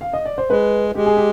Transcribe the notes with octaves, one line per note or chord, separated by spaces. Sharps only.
F5
D#5
D5
C5
G#3 B4
G#3 G4
G#4
G4